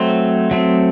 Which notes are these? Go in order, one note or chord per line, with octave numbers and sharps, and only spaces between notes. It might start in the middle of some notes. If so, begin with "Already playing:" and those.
Already playing: F#3 A3 C4 C5
F#3 A3 C4